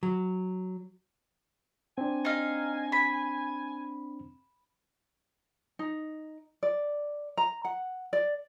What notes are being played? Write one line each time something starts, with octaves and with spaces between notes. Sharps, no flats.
F#3
C4 D4 G#5
D#4 F5
B5
D#4
D5
A#5
F#5
D5